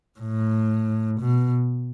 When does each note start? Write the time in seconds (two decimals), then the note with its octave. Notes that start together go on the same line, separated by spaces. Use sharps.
0.20 A2
1.20 B2